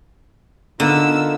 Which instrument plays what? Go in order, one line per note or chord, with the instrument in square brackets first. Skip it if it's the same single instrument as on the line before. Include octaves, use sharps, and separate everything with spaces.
[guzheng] D3 [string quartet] B3 E6 [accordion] D#4 F4 A#4